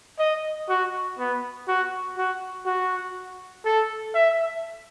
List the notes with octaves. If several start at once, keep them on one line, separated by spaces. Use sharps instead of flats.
D#5
F#4
B3
F#4
F#4
F#4
A4
E5